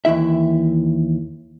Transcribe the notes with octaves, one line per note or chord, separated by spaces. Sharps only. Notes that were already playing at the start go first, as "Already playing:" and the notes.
D#2 E3 E4 E5